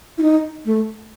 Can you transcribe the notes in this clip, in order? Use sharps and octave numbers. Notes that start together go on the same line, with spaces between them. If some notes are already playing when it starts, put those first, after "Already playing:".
E4
D#4
A3